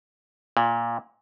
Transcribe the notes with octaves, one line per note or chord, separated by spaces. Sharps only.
A#2